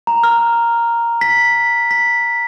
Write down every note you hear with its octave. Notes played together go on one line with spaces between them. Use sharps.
A#5
F6
B6
B6